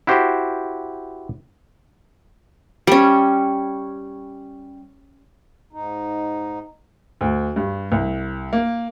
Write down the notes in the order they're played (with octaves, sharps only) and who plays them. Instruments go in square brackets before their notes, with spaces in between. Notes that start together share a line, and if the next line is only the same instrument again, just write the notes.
[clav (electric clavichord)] E4 F#4 G4 C5
[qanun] G3 C#4
[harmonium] G#2 D#4
[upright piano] D2
G2
C2
A#3